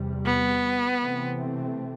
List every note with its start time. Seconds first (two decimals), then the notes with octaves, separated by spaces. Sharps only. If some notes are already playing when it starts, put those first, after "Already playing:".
Already playing: E2 C3 G3
0.25 B3
0.99 C3 E3 A3 C4